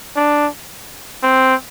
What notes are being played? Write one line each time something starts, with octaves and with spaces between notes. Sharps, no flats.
D4
C4